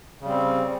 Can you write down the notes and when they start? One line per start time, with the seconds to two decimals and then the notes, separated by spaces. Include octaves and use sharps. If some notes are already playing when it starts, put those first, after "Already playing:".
0.21 C#3
0.25 G3
0.29 C4